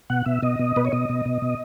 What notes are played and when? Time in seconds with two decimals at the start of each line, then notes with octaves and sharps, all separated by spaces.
0.10 B2 F#5
0.26 B2 E5
0.42 B2 D#5
0.59 B2
0.76 B2 B4
0.85 C#5
0.92 B2 D#5
1.09 B2
1.25 B2
1.42 B2